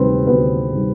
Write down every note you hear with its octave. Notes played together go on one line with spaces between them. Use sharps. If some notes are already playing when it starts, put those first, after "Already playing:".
Already playing: D2 C3 D#3 G3 C4 B4 C5
D2 B3 B4
C3 D#3 G3